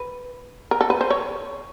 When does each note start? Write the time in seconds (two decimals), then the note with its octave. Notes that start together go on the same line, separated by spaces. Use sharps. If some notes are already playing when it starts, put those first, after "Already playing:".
Already playing: B4
0.71 A#4
0.81 A4
0.90 B4
1.01 C5
1.10 C#5